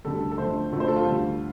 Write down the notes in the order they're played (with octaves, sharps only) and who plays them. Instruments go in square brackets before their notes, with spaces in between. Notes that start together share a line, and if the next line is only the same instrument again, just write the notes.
[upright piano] D2 D3 G3 A4
A4
F2 D3 A3 C5
D2 D3 F3 A3
C5
A4
F4
D2 D3 G3